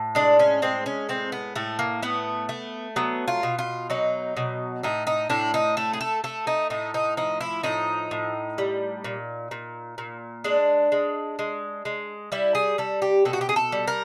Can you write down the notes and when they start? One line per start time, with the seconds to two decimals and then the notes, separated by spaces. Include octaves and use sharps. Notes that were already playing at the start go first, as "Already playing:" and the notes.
Already playing: A2
0.15 G#3 D4
0.39 C#4
0.62 G#3 C4
0.86 C#4
1.09 A2 C4
1.32 B3
1.55 A2 A3
1.79 A#3
2.02 A3 B3
2.49 A3
2.96 F#3 B3
3.28 F4
3.43 B2
3.59 F4
3.90 F#3 D#4
4.36 B2
4.83 A2 D#4
5.07 D#4
5.30 A2 D4
5.54 D#4
5.77 A3 A4
5.93 G#4
6.01 A4
6.24 A3 A4
6.47 D#4
6.70 A2 D#4
6.94 D#4
7.17 F3 D#4
7.41 E4
7.63 A2 D#4
8.11 A2
8.58 G3
9.04 A#2
9.51 A#2
9.98 A#2
10.44 G#3 D4
10.92 G#3
11.39 G#3
11.85 G#3
12.32 G3 E4
12.55 G#4
12.78 G3 A4
13.02 G4
13.25 B2 A4
13.33 F#4
13.41 G4
13.49 G#4
13.56 A4
13.72 G3
13.87 A#4